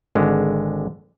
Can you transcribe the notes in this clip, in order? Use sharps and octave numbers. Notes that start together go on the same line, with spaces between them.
G#1 D3 G#3